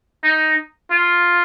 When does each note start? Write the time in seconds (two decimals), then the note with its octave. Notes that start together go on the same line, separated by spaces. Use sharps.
0.24 D#4
0.91 F4